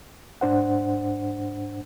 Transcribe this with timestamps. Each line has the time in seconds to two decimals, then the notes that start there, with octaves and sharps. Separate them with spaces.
0.41 G#2 D4 C5 F#5